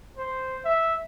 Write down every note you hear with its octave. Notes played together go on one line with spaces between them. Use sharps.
C5
E5